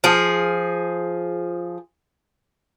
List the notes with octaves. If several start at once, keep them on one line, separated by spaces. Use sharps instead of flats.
F3 G#4